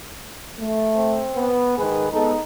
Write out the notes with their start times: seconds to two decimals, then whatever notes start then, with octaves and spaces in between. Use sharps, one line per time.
0.59 A3
0.96 C4
1.34 B3
1.78 G#2 D#3 G#4 B4
2.12 G#3 B3 D#4 A4